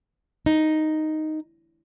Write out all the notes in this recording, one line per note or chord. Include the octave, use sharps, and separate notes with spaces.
D#4